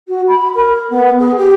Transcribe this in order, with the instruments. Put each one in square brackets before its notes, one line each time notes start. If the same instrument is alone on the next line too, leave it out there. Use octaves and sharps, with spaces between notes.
[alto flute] F#4
B5
A#4
B3
G#4
G4